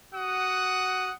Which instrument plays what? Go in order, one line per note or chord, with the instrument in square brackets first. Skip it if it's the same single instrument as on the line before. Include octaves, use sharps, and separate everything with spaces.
[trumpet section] F#4 F#5 D#6